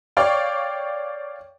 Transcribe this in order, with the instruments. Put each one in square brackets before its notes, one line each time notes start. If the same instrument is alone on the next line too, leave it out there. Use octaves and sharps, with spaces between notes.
[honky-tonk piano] C#5 D5 F5 G5 C#6